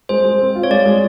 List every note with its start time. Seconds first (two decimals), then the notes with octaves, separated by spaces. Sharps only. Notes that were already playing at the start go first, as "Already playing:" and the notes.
0.09 G#3 C5
0.24 G#3
0.40 C4
0.55 F4
0.63 C#5
0.70 G#3 D5
0.86 G#3